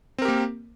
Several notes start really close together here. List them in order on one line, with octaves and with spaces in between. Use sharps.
C4 A#4 G4 A#3